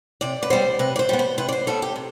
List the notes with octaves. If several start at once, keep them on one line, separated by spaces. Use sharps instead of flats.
C3 D5
B4
G3 B3 C5
C3 B4
D5
C5
G3 B3
C5
C3 B4
D5
C5
G3 B3 A4
G4
C3